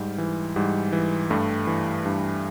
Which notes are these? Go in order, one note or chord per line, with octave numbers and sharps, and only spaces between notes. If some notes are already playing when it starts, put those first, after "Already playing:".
Already playing: G#2 G3
E3
G#2 G3
E3
G2 G3 A3
E3
G2